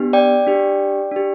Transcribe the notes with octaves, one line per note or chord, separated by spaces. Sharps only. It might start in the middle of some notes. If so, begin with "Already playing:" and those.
Already playing: B3 D4 G4
D5 G5
D4 G4
D4 G4